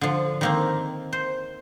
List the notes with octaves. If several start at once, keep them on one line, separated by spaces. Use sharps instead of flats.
D3 F3
D#3 A#3 C4
C5